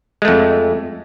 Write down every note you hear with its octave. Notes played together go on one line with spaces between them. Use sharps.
F2 G#3 A3